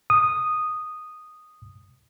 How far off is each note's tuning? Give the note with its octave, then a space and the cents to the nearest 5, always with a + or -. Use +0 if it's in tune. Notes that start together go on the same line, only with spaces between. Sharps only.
D#6 -5